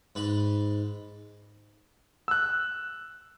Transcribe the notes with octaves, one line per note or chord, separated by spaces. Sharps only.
G#2 B4
E6 F#6